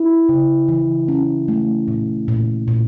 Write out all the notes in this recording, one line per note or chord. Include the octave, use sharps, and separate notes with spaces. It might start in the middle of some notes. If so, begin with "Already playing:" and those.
Already playing: E4
C#3
E3
C#4
A3
A#2
A#2
A#2